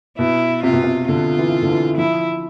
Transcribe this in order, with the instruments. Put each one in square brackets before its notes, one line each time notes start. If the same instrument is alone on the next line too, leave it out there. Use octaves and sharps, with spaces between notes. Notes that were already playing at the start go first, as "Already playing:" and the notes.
[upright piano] B2 [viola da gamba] E4
[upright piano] C3 [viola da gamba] F4
[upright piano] B2
C3
[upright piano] D3 [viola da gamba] F4
[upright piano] E3
D3
E3
[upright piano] F3 [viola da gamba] E4